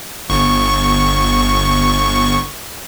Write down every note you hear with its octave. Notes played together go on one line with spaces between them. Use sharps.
G1 C#6